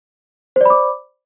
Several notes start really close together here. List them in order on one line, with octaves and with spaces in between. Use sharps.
C5 D5 B5 D6